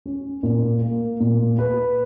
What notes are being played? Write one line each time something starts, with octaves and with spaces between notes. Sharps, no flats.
C#4
A#2
A#3
A#2
B4